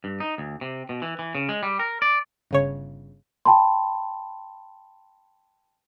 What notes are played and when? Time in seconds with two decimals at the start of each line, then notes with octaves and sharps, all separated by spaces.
0.04 G2
0.20 D#4
0.38 D2
0.61 C3
0.89 B2
1.02 E3
1.19 E3
1.35 C#3
1.49 G#3
1.63 G3
1.79 A#4
2.02 D5
2.51 G1 C#3 C#5
3.45 G5 A5 B5 C6